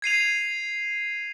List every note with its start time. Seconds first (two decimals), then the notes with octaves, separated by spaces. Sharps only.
0.02 G#6 C7 D#7 F7